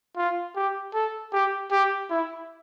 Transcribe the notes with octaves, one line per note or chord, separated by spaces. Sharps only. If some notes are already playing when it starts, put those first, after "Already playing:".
F4
G4
A4
G4
G4
E4